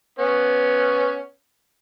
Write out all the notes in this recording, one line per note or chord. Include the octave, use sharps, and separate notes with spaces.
B3 C#4